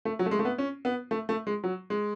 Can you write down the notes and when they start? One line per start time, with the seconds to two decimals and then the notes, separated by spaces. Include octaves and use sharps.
0.05 A3
0.19 F#3
0.26 A3
0.31 G#3
0.39 A3
0.45 B3
0.58 C#4
0.85 B3
1.11 A3
1.29 A3
1.47 G#3
1.64 F#3
1.90 G#3